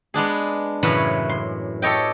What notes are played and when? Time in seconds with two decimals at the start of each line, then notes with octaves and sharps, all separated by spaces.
0.14 G#3 B3 D4 G#4
0.83 F#2 A2 C#3 E3 B4 C#5
1.30 C6
1.82 G4 A4 C#5 D#5 G5